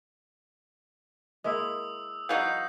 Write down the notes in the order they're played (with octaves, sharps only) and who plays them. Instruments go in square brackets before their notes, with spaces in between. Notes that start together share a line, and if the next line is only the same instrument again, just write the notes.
[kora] G#3 A#3 E4 [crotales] D#6 E6
[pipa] E3 F#3 D#4 [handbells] F5 [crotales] G6 C7